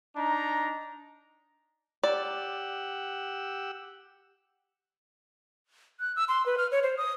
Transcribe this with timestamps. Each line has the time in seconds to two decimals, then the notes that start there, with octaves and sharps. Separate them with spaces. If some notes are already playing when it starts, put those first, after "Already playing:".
0.17 D4 D#4 A#5
2.04 G4 D5 F#5 E6
6.00 F#6
6.16 E6
6.28 C6
6.46 B4
6.58 F6
6.72 C#5
6.83 C5
6.97 D#6